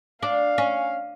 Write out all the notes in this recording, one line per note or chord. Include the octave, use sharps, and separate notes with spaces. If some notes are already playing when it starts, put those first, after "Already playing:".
D4 F5
C#4